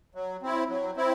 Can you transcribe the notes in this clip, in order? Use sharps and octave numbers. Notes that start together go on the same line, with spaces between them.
F#3
C4 E4
F#3
C4 E4